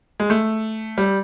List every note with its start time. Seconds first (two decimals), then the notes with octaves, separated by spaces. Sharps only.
0.20 G#3
0.30 A3
0.98 G3